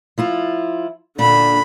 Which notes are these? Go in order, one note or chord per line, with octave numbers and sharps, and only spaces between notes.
F3 E4 F4
A#2 D3 D4 B5